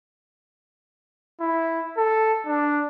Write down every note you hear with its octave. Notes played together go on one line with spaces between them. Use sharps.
E4
A4
D4